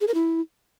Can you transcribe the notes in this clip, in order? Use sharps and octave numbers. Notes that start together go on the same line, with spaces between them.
G#4
A#4
E4